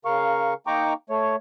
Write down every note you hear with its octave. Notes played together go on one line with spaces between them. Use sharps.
C#3 A#4 F5 C#6
A#3 D#4 G5 A#5 C#6 D6
A3 C#5